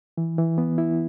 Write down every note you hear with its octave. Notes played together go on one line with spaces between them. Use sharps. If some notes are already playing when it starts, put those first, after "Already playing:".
E3
E3
B3
E4